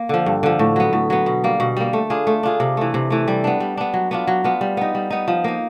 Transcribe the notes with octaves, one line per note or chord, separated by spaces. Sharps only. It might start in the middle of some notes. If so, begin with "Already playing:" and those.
Already playing: A#3
D3 F3
G2
D3 F3
A2
F#3 B3
A2
F#3 B3
B2
G3 A#3
B2
G3 A#3
A3
D4 F4 G#4
A3
D4 F4 G#4
C3
E3 A3
C3
E3 A3
G3
B3 D4
G3
B3 D4
F#3
B3 D4 F4
F#3
B3 D4 F4
G3
B3 D#4
G3
B3 D#4
F3
A#3 D#4